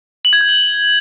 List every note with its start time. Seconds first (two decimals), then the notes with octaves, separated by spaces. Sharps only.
0.25 F#7
0.33 G#6
0.41 G6
0.49 G7